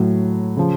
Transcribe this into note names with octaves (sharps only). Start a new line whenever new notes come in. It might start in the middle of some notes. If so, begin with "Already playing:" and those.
Already playing: A2 F#3
C#3 F3